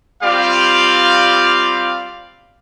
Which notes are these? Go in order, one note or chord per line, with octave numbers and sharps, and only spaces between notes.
G3 C4 F4 G4 D5 F5